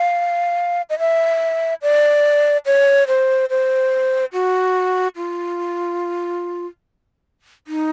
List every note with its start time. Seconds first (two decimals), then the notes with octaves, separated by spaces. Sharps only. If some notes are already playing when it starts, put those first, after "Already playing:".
Already playing: F5
0.90 D#5
0.99 E5
1.82 D5
2.66 C#5
3.08 C5
3.50 C5
4.33 F#4
5.16 F4
7.67 D#4